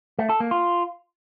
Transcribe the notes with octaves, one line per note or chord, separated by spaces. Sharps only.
A3
A4
A#3
F4